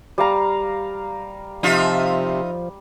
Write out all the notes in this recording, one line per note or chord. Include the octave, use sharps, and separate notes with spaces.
G3 F5 A#5
C3 F3 D#4 F4 E5